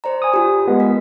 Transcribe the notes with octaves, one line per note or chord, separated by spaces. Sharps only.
C5 D5 A#5
G#5 D#6
F4 G4
G#3 B3 G#4
A#4 B6